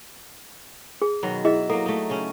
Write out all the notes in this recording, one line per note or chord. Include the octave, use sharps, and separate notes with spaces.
G#4
B2 D#3 F#3
E4 G#4 D#5 E5
F#3 A#3 A4
A3 D#4
C#3 C#4